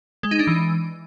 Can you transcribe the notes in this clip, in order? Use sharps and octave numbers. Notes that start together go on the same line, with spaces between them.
G#3
D#4
D4
E3